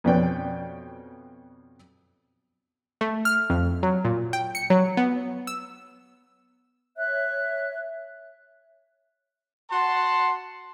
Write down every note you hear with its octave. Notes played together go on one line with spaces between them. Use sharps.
F2 B2 C#4 B4 D5 G5
A3
F6
F2
F#3
A#2
G5
C#7
F#3
B3
E6
C#5 E5 F#6
F#4 F#5 A5 C6